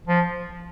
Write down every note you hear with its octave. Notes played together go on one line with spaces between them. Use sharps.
F3